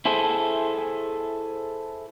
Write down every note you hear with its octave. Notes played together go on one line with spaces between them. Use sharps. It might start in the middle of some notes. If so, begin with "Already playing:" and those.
E4 G#4 A4 C5